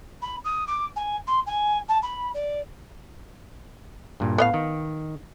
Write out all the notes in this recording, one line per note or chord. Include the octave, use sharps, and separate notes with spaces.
B5
D#6
D6
G#5
C6
G#5
A5
B5
D5
G2 A#2
A2 B3 D#5 F5
D#3